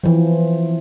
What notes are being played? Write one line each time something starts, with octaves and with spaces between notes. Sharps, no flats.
E3 F3